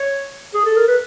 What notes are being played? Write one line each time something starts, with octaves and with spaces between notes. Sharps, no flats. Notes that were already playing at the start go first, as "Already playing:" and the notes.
Already playing: C#5
G#4
A4
A#4
B4